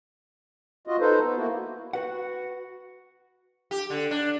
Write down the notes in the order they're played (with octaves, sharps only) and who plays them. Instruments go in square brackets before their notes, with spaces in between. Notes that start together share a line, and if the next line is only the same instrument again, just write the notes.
[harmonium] F4 F#4 D#5
D#4 A4 B4 C5
B3
A#3 E4 F#4
[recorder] F#4 [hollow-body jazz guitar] B4 F#5
[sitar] G4
D3
D4